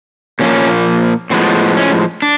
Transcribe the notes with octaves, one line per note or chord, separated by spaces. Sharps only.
A#2 F3 A#3 C#4
A2 F3 G#3 B3 C4
C#4
D4